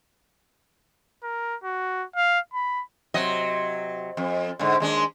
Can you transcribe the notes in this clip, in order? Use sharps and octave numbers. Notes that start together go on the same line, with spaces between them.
A#4
F#4
F5
B5
C3 F#3 D#5
F2
G#2 D3
D#2 G#3 D4